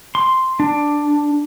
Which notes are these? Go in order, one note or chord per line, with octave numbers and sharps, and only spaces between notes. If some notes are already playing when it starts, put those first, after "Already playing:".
C6
D4